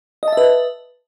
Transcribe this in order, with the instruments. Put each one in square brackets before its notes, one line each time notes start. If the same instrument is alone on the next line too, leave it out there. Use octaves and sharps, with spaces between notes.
[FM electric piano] D#5
A5
E5
B4